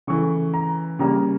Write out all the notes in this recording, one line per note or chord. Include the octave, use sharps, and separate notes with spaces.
C#3 E3 A3 C#6
A#5
C#3 G3 A#3 A#5